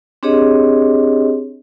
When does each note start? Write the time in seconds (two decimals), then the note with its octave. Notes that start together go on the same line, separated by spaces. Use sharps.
0.23 C4 D4 G4 G#4 C#5 D#5